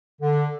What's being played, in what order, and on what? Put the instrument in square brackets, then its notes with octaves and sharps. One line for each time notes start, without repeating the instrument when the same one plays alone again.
[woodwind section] D3